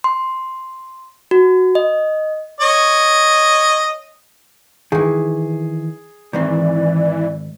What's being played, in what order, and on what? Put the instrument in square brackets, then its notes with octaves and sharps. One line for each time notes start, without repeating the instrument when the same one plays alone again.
[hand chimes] C6
F#4
D#5
[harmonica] C#5 D#5
[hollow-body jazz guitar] D#3 E3 [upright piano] G#4
[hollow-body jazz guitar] G#2 D#3 C4 [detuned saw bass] E3 [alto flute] D5